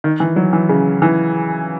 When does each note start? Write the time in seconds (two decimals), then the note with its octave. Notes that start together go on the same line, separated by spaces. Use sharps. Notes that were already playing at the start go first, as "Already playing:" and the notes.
0.04 D#3
0.20 E3
0.36 F#3
0.53 E3
0.69 C#3
1.02 E3